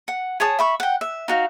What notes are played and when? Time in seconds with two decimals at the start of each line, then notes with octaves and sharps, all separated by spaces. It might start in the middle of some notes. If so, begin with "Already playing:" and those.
0.08 F#5
0.40 G#4 C#5 A5 D#6
0.59 E5 B5 C#6
0.80 F#5 G5
1.01 E5
1.28 D#4 F#4 F5